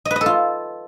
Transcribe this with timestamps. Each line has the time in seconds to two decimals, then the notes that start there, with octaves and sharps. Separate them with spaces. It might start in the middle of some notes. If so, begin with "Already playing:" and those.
0.05 D#5
0.11 B4
0.16 D#5
0.21 A4
0.26 F4